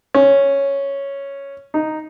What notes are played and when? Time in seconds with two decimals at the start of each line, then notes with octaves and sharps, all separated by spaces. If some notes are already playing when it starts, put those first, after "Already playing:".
0.14 C#4
1.74 D#4